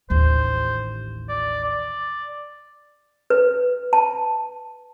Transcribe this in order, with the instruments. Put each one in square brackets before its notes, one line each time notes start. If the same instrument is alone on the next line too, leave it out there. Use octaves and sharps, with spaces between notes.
[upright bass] A1 D#2 [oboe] C5
[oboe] D5
D5
[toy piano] B4
A5